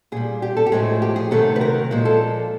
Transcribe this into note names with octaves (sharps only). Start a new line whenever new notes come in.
A#2 G3 G#4
G4
A4
G4
A2 F3 G#3 G#4
G4
G#4
C3 D#3 F#3 A3 A4
B4
A#4
A#2 F3 G#3
A4